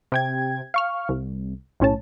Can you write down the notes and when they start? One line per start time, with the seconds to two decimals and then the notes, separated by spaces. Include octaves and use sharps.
0.12 C3 G5 G#6
0.74 F5 C#6 F6
1.09 C2
1.80 B1 A2 C#4 C#5 A5